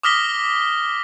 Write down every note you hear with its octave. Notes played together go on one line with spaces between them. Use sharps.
D6 D#6 F6 A#6 B6 G7